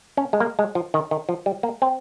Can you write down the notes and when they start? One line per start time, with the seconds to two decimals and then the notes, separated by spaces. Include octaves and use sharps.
0.17 C#4
0.33 G#3
0.40 A#3
0.59 G#3
0.75 F3
0.94 D#3
1.11 D#3
1.29 F3
1.46 G3
1.63 A#3
1.82 C4